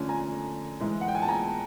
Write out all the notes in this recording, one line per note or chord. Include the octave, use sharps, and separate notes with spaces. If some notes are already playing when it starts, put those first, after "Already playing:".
Already playing: D3 F3 A3 C#4
G#5 A#5
G#2 E3 G#3
F#5
G5
G#5
A5
G#5 A#5